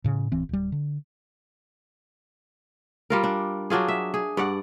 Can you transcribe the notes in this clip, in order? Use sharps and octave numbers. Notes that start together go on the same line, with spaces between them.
A2 C#3
D1 E3 C4
D1 G3
D3
G3 F4 A#4
D4
F#3 D4 F4 G#4
E5
G#4
G2 D5 F#5